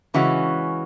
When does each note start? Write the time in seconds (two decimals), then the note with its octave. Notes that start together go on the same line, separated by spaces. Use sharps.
0.14 C#3 E3 G#3 C#4 F#4